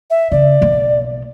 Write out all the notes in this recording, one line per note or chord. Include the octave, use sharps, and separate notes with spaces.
E5
C#3 D5
B1 A#3